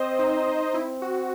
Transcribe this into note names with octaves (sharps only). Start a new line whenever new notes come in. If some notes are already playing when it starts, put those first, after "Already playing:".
Already playing: C4 C5 D#5
D#4
C4 E4
F#4